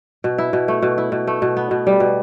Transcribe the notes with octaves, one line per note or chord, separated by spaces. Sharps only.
B2
E4
B2
A3
B2
E4
B2
A3
B2
B3
B2
G3
B2